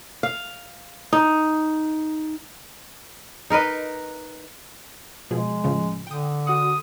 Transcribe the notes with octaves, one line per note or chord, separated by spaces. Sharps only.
F5
D#4
D#4 A#4 B4 D#5
B2 F3 G#3 G#4
A2 C#3 F3
D3 G5 D#6
F#4 F#5 D#6